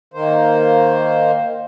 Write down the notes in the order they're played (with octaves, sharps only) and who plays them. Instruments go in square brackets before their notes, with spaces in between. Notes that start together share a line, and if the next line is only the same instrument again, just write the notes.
[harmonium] D#3 A#3 C5